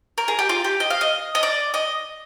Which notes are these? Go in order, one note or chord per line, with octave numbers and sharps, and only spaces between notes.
A#4
G#4
G4
F4
G4
D#5
F5
D#5
D#5
D5
D#5